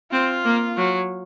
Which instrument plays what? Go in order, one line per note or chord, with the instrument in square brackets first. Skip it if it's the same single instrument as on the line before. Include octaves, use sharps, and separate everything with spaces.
[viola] C4 [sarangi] F4
[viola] A#3
F#3